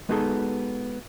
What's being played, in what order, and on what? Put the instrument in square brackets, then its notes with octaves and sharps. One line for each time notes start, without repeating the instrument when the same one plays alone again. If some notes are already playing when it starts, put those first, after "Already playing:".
[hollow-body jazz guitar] G#3 B3 D#4 F#4 G#4 A4